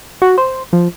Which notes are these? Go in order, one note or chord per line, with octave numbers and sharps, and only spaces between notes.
F#4
C5
F3